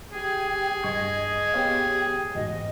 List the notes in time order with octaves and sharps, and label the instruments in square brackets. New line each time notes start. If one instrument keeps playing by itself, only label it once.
[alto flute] G4 [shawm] G#4
[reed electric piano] G2 C#6 G#6 [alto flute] D#5
[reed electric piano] B3 C#5 F5 [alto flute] G4
[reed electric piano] E2 G#2 F#4 [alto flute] D#5